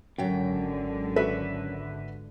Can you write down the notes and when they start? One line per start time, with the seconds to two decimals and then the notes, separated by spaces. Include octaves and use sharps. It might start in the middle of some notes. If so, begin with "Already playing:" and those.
0.18 G#1 F#2 D3 F#3 G5
1.16 F#4 B4 E5